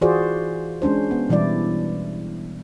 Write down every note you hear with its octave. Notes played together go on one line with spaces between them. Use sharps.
E3 F4 F#4 G#4 C5 D5
G#3 C#4 D4 C5
B3
B2 E3 G3 E4 D5